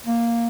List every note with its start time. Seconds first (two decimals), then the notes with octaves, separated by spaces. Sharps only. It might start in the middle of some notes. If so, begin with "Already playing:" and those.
0.07 A#3